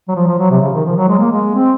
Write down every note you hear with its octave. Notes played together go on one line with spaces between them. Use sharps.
F#3
F3
F3
F#3
C3
C#3
D#3
F3
F#3
G#3
A#3
G#3
C4